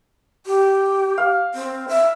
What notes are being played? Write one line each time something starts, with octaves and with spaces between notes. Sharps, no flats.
G4
F5
C4
E5